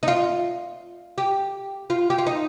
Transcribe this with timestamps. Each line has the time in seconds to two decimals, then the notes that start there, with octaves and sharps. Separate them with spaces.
0.03 D#4
0.08 F4
1.18 G4
1.90 F4
2.10 G4
2.18 F4
2.26 D#4